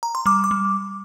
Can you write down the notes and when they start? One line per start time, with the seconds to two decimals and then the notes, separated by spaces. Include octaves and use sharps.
0.03 A#5
0.15 C6
0.26 G3 D6
0.44 D6
0.51 G3